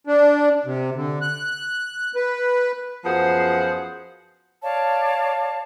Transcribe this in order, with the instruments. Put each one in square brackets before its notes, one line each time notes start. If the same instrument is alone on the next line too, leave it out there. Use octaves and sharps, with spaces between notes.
[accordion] D4
C3
D3
F#6
B4
[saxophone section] F#2 F3 B3 G#4 C5 F#5
[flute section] C#5 D5 F5 A5